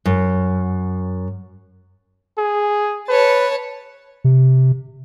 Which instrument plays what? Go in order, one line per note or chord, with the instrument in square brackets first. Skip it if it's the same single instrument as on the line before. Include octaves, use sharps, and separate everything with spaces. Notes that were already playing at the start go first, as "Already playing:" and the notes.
[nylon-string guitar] F#2
[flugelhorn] G#4
[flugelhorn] B4 [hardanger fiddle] C#5 A5
[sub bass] C3